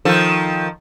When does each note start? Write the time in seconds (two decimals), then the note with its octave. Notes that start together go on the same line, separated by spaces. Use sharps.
0.05 D#3 F3 A4